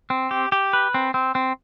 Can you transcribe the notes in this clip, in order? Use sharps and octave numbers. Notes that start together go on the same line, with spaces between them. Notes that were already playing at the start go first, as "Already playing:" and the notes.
C4
G4
G4
B4
C4
C4
C4